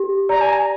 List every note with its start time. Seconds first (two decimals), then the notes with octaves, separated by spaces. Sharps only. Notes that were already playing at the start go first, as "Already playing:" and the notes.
Already playing: G4
0.29 D5 A#5
0.41 G#5
0.53 A#5